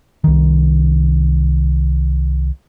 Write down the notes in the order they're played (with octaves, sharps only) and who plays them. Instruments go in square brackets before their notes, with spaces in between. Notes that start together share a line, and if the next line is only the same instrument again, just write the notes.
[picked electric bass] C2 D#3